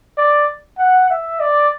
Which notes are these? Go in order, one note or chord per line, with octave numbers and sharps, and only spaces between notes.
D5
F#5
E5
D5